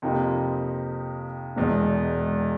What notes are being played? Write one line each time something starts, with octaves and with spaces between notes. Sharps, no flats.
F2 C3 F3 A#3 D#4
E1 E2 B2 G#3